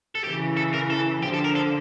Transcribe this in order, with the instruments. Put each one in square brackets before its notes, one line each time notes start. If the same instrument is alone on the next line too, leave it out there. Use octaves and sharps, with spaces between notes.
[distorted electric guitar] A4
[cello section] C#3 E3 [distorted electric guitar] G4
[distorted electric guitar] A4
A#4
A4
[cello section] D3 F3 [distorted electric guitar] G4
[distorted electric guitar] A4
A#4
A4